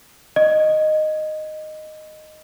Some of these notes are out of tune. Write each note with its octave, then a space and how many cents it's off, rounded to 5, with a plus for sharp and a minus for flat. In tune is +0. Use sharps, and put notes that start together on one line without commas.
D#5 -10